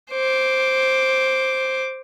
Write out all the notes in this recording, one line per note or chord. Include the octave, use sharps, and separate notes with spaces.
C5 D6